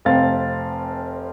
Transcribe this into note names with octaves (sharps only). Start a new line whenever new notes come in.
F1 C4 F5 A6